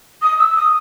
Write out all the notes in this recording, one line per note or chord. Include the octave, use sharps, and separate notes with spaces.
D#6
E6
E6
D#6